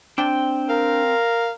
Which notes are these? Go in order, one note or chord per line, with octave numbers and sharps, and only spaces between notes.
C4 D4 G5
A#4 F5